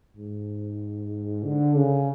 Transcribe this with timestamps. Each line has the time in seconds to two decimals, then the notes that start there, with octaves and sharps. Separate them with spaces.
0.16 G#2
1.44 D3
1.76 C#3